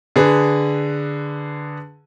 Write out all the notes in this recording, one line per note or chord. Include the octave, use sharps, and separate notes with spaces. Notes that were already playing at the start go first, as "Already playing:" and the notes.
D3 G#4 B4